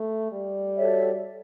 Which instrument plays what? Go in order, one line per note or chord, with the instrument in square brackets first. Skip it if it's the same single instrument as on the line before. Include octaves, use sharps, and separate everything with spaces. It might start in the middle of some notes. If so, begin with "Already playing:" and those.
Already playing: [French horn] A3
G3
[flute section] F#4 A4 C#5 E5